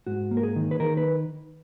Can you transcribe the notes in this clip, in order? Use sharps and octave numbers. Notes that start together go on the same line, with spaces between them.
G#2 F#4
A#3
A#4
G#4
D#3
B4
D#3 A#4
B4